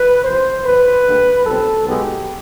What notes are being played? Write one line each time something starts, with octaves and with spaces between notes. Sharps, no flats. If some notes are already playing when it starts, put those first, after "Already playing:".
Already playing: B4
C2 C3 F3 C5
E2 B2 F#3 B4
D2 D3 G3 A#3
B1 A#2 G3 C4 A4
B1 B2 G#3 B3 G4